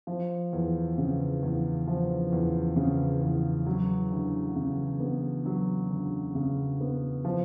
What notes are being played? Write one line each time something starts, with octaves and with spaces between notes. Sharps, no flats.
F3
E2
C#3
E2
F3
E2
C#3
E2
F#3
D2
C#3
B3
F#3
D2
C#3
B3
F3